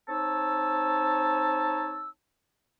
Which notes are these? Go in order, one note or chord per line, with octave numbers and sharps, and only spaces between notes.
C4 D#4 C#5 A5 E6